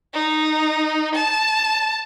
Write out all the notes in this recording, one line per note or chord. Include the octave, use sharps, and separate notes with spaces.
D#4
A5